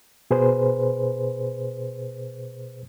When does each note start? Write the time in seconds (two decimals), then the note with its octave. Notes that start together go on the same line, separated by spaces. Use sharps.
0.31 B2 G#4 B4 C5